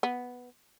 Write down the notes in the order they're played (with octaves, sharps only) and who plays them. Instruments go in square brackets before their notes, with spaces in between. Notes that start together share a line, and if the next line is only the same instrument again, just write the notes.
[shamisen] B3